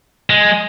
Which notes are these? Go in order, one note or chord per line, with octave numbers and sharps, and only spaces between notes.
G#3